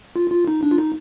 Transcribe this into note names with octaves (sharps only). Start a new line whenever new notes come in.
F4
F4
D#4
D4
F4
D#4